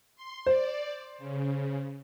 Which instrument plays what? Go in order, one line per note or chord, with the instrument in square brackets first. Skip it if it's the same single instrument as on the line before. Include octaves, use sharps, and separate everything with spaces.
[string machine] C6
[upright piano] C5 [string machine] D5
[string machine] C#3